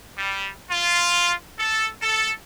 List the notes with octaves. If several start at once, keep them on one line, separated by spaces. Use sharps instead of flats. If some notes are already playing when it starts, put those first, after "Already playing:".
G3
F4
A4
A4